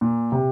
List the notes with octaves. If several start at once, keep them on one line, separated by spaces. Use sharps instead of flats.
A#2
C3